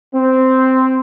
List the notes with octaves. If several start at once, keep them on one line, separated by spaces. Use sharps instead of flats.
C4